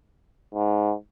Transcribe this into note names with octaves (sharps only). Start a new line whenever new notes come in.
G#2